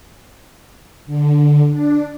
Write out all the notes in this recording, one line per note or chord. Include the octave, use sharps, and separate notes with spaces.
D3
D4